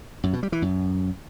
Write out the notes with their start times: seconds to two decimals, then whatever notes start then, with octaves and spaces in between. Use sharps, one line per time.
0.24 F#2
0.33 B2
0.43 G3
0.52 E3
0.62 F#2